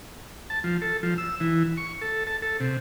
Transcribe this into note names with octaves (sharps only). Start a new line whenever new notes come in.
A5
F3
A4
F3
E6
E3
C#6
A4
A5
A4
C3